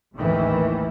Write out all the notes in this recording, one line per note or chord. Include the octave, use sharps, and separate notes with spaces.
A1 D#2 G#2 D#3 E3 A3